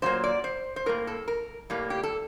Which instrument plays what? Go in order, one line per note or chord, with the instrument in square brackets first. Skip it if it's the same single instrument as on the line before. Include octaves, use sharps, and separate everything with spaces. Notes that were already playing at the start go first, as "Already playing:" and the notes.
[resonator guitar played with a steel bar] A#2 F#3 A#3 C5
D5
C5
C5
A2 G3 A#3 A#4
A4
A#4
A2 G3 A#3
G4
A4